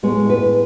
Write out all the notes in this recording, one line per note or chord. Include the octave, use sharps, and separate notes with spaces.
A2 G#3 B3 C#5
B4